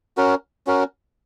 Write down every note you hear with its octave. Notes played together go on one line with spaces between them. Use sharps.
C#4 F#4 A#4
C#4 F#4 A#4